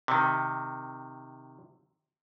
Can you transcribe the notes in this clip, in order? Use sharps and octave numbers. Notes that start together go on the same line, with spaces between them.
C3 D#3